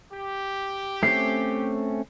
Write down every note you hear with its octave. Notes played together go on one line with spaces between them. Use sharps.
G4
A3 C4 C#4 C7